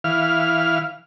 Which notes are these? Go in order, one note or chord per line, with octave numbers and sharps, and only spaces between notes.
E3 F5 F6